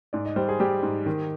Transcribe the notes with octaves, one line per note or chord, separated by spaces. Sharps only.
G#2 D5
D#5
G3 C5
G#4
G3 G4
G#2
D#3